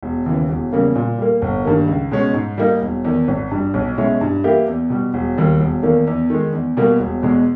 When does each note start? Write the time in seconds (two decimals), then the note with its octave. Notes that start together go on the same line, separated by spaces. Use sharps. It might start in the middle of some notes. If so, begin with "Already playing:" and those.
0.03 E1
0.26 D#2 C#3 E3
0.49 E1
0.73 E2 C#3 G3 A#3
0.95 A#2
1.18 G3 A#3
1.42 G1
1.65 G2 D#3 A#3
1.88 C#2
2.11 B2 G#3 C#4
2.34 G#2
2.58 G3 A#3 D#4
2.81 E1
3.05 E2 D#3
3.28 G#1
3.51 G2 G3
3.74 B1
3.98 B2 G#3 C#4 E4
4.21 G2
4.44 E3 A#3 E4 G4
4.68 E2
4.90 B2 G3
5.14 E1
5.38 D#2 D#3 G3
5.60 E1
5.83 E2 D#3 A#3
6.07 E2
6.30 D#3 G#3
6.53 E2
6.77 B2 G3 A#3
7.00 E1
7.23 E2 B2 G#3